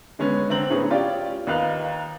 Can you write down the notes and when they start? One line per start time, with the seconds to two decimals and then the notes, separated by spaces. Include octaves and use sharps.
0.19 D3 G#3 B3 C#4
0.50 D3 C4 A#5 F#7
0.70 A2 B3 C#4 G#4
0.90 C#4 F4 G4 D5
1.47 D#2 D#4 B4 F5 F#6